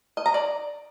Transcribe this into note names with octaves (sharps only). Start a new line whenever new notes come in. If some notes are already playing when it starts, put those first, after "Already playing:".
D#5
A#5
D5